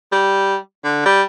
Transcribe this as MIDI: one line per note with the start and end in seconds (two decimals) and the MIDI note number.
0.12 0.56 55
0.84 1.04 50
1.06 1.22 55